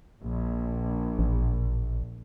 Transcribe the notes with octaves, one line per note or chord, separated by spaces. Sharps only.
A#1
A1